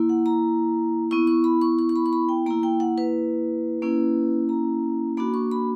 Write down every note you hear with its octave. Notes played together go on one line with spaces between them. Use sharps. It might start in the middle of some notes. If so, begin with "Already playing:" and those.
Already playing: A#3 E4
F#5
A#5
B3 E4 C#6
C#6
B5
C#6
C#6
C#6
B5
C#6
B5
G5
A#3 E4 A#5
G5
F#5
B4
A#3 C#4 E4
A#5
A#3 D4 F#4 B5
C#6
B5